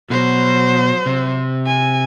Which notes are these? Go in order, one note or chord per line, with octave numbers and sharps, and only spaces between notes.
B2 F#3 C5
C3
G#5